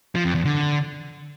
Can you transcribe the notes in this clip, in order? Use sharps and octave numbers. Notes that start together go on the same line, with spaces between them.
F3
F2
E2
D3